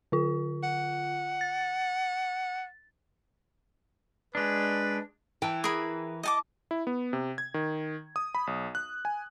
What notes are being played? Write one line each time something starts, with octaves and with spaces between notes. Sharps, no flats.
D3 F4
F#5
A6
G#3 D4 B4
E3 G5 A5
G#4 A#4 B5
D#5 A5 D6
E4
B3
C3
G#6
D#3
D#6
B5
B1
F#6
G#5